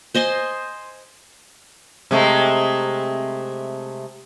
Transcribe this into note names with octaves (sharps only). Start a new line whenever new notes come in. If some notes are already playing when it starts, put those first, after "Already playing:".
C5 D#5 G#5 C6
C3 G#3 A3